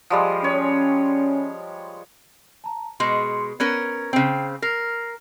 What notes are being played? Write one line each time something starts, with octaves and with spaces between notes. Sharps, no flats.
F3 G3 G#3
C#4 C#5
A5 A#5
B2 G#3 C6 C#7
B3 C#4 A#4 G#6
C#3 C4 G5 C7
A#4 F6 A#6 C7